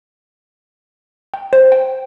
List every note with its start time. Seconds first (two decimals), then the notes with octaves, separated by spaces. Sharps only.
1.34 G5
1.53 C5
1.72 G5